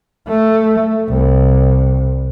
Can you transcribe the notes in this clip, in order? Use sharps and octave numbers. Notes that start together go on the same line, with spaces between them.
A3
C2